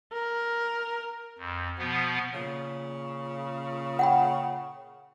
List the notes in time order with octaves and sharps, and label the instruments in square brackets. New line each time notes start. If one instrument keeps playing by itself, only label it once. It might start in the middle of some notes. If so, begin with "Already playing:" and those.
[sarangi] A#4
[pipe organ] F2
B2 F3 B3
[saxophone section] A#2 C#3
[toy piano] F#5 G5 B5